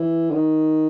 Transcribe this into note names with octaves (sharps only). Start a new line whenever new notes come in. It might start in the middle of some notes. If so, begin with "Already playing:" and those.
Already playing: E3
D3
D#3